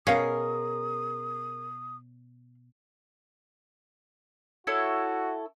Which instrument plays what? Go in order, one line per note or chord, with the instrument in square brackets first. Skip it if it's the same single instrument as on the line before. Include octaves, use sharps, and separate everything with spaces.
[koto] B2 C#4 [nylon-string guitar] G#4 A#4 [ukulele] C#5 F5 [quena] D#6
[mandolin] E4 A4 C#5 [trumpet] F#4